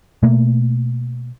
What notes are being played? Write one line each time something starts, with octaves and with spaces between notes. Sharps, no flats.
B2 A3 A#3